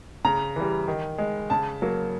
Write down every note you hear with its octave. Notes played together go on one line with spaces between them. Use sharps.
C#3 A#5
E3 G3
D#3
G#3
C#3 A5
F#3 A#3